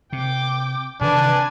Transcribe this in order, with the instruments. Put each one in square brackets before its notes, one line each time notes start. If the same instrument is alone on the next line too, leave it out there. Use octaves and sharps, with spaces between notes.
[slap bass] C3 [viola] G5 D6
[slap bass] C3 D#3 E3 [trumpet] D4 [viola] B4 G#5